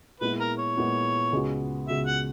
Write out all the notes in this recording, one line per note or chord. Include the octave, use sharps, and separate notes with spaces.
A#2 G#3 B3 E4 B4
A#4
C#5
A#2 G#3 B3 E4
C#2 C#3 G#3 B3 F#4
C#2 C#3 G#3 B3 F#4 E5
F#5